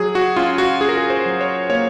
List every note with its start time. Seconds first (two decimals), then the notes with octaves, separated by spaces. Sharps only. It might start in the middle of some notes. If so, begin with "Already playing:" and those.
Already playing: F#3 G#4
0.15 F#4
0.36 C#4 F4
0.58 F#4
0.81 C#4 G#4
0.89 A#4
0.97 G#4
1.10 C5
1.25 F#3
1.41 C#5
1.70 A#3 C#5